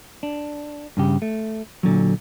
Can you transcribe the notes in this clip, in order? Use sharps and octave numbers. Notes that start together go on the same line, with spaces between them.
D4
G2 C#3 G4
A3
A#2 D3 D#3 F#3